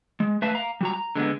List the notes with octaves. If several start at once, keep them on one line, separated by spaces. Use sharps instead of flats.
G#3
A3 B4 E5 F5 A5
F5 A#5
G3 F#4 A#5
A#5
D3 G#3 A#3 B3